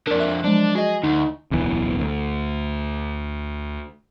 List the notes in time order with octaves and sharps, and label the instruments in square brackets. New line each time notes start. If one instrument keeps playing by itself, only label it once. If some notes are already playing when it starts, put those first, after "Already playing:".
[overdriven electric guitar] F2 D3 [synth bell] A#4 D5
[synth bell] E5 F#6
[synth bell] F3 F#3 G#3 [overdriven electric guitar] D4
[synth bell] F#4 D#5 [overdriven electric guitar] G#4
[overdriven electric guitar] D2 [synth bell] D#4
[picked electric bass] D1 B1 E2 E3
D2